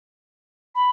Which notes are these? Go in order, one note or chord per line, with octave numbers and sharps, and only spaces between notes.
B5